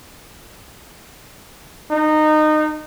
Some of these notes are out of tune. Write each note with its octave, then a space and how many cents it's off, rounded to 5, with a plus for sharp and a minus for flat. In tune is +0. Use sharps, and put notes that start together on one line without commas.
D#4 -20